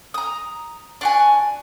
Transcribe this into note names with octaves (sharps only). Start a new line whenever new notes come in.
A#5 D#6
D4 F#4 G#5